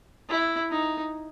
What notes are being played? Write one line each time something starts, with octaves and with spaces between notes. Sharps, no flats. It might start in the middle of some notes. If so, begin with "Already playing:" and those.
E4
D#4